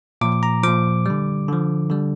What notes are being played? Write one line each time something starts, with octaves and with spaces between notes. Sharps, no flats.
A#2 F3 D6
A#5
A#2 F3 D6
D3 G3
D3 F3
D3 G3